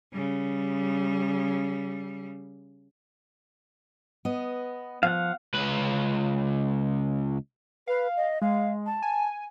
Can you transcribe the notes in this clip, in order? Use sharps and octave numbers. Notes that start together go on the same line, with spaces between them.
C#3 G3
B3 D#5
F3 F5 F#5
C#2 B4
B4 F5
D#5
G#3 F5
A5
G#5